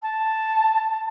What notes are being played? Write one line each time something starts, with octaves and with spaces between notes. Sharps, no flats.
A5